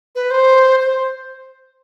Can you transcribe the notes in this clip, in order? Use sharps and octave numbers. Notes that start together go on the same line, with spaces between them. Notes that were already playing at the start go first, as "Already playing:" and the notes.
B4
C5
C5